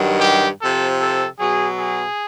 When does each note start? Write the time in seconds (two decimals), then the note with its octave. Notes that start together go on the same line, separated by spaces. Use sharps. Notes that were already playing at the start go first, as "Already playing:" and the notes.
Already playing: G2 D#3 F#3
0.20 G4
0.59 C3 F3 A4
1.00 A4
1.38 B2 F#3 G#4
1.78 G#4